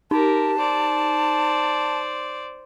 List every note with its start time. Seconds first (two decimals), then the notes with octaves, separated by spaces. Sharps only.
0.11 D#4 G4 A#4 A5
0.58 C5 D5